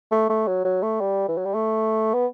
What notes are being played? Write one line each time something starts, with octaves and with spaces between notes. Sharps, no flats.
A3
A3
F#3
F#3
A3
G3
E3
F#3
G3
A3
B3